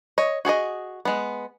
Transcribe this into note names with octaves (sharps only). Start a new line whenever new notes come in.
C#5 D#5
F#4 G#4 A4 D#5
G#3 B3